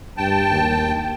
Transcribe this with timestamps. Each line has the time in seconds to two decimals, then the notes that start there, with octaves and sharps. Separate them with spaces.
0.17 G2 G5 A5
0.50 D#2